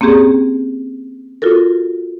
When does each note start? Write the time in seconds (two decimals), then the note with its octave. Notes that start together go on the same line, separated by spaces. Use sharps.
0.01 A#3 C4 C#4 G4 G#4
1.42 F4 F#4 A4 A#4